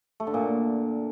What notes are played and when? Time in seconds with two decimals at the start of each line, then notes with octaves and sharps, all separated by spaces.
0.20 A3
0.27 D3
0.34 A#2